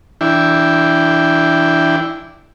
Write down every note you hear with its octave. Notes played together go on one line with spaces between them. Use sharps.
E3 D4 E4 G5